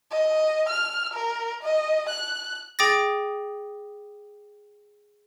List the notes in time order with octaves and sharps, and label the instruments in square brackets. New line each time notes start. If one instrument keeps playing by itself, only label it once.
[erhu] D#5
F6
A#4
D#5
F#6
[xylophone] G#4 G5 D6 D#6 A6 A#6